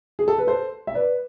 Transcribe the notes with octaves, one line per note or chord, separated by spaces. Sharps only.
G#4
A4
B4
A4 C5
E5
B4 D5